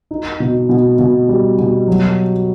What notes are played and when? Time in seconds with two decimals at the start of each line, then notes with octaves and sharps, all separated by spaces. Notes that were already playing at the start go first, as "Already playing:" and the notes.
0.11 D#4
0.40 B2
0.69 B2
0.99 B2
1.29 G3
1.58 B2
1.88 F#3